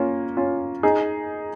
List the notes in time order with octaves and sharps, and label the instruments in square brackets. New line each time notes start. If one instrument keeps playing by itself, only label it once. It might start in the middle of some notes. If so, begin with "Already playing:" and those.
Already playing: [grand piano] A#3 C#4 F4
C#4 F4
D#4 G#4